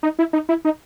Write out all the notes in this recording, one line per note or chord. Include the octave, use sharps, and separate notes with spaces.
D#4
E4
D#4
E4
D#4